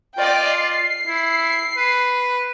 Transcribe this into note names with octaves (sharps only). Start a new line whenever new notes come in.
F4 D5 D#5 G5
C7
E4
B4